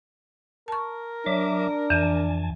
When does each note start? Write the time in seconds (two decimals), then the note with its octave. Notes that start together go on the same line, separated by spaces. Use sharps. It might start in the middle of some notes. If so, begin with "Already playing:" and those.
0.68 A#4 A5 C#6
1.26 F#3 D4 E5 D6
1.90 F2 E3 G#5 A5